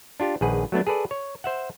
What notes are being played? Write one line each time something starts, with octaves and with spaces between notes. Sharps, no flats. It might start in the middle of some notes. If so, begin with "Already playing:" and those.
D4 F4 G4
A#1 D#3 G#4 B4 F#5
F#3 A3 B3 D4
G#4 A4 B4 D5
C#5
C5 E5 F#5